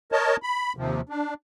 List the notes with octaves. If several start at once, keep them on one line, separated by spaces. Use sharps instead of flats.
A#4 C#5 D#5 A5
B5
D#2 C3 F3
D4